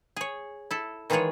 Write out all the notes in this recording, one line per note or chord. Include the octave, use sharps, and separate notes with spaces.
G#4 C#5
E4 A4
D#3 E3 G#3 F4 G#4 C#5